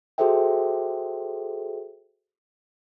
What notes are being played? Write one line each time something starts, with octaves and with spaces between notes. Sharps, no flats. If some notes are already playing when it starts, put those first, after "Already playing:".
F#4 G#4 A4 C5 E5 G5